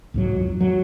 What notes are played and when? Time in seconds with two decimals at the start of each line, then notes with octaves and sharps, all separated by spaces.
0.14 C2 G#2 F#3
0.35 F2
0.61 F#3